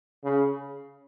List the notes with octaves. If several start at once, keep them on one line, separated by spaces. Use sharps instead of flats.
C#3